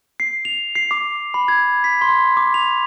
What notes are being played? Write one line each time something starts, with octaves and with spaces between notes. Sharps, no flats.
C7
F7
C7
D6
B5
G#6
B6
C6
D6
F7